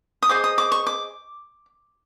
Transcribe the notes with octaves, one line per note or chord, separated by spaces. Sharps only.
D#6
G#4 C5 D#5 D6
D#6
D6
C#6
D6